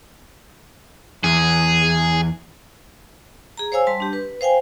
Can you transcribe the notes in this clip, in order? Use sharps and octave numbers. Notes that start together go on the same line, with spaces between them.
E2 G#4
G#4 A#5
C5 C#5 F5 G#5 E6
G3 A5 C6
D4 G4
B4
C5 F5 G5 G#5